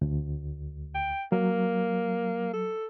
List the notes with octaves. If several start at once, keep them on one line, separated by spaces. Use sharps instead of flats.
D2
G5
F#3 A#3
A4